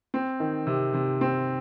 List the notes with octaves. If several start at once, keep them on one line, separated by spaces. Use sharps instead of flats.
C4
D#3
C3
C3
C4